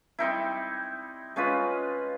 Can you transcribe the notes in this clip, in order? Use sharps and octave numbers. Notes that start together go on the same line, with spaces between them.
G3 C4 D#4 E4
G#3 C#4 F4 B4